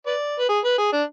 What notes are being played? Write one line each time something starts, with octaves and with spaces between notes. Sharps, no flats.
B4 D5
B4
G#4
B4
G#4
D4